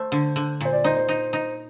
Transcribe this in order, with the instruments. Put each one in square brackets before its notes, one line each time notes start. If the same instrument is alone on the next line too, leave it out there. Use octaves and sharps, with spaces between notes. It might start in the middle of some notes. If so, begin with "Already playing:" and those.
Already playing: [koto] A3 [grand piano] C5
[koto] D3
D3
[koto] A#2 [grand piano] C5
[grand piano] D5
[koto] D#4 [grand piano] C5
[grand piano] C5
[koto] D#4
D#4